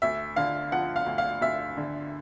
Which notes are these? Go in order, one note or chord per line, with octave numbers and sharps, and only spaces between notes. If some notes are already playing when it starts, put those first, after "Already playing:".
D2 E5
D3 F5
F3 F#5
F5
D2
F5
D2 E5
D3